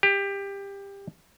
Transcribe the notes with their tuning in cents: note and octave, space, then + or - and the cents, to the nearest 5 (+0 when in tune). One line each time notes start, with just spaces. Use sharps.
G4 +20